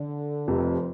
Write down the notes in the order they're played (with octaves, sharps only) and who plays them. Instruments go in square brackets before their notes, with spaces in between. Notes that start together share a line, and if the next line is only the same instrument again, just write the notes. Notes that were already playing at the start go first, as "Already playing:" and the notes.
Already playing: [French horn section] D3
[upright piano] F1 F2 C3 [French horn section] F3